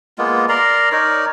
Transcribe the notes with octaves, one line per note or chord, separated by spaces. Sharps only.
G#3 A#3 B3 F4
A#4 D5 A#5 C6
D#4 A#4 C#5 D5